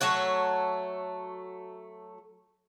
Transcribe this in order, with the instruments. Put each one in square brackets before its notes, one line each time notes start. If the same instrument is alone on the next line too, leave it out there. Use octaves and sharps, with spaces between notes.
[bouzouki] F#3 A3 C#5 F#5